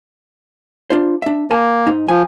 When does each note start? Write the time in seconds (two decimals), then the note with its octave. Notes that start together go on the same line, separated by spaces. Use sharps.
0.90 D4 F4 C5
1.22 D4 E5
1.51 A#3 A#4 G#5 A5
1.87 G#2 D#4
2.08 F3 G#5